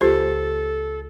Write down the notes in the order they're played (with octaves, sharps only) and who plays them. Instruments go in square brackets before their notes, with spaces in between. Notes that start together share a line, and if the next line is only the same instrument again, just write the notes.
[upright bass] C#2 [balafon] F4 C5 [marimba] G4 [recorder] A4